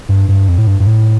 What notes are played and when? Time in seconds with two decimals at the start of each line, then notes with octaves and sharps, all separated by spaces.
0.09 G2
0.29 G2
0.48 F2
0.58 A2
0.67 G2
0.80 G2
0.87 A2